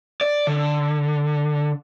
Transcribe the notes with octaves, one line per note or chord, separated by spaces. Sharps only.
D5
D3